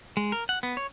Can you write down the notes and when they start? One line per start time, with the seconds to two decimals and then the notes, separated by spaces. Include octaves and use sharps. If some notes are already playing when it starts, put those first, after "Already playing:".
0.17 G#3
0.32 A#4
0.49 F#5
0.63 B3
0.77 C#5